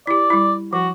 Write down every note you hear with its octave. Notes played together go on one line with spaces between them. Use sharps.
E4 G4 D5
G3 E4
F3 F#4